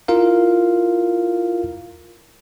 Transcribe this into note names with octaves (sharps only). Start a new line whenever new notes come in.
E4 F4 A#4 F5